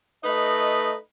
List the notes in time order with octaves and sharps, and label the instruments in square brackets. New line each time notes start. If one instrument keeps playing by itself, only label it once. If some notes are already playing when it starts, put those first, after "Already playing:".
[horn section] A3 D#4 B4 D#5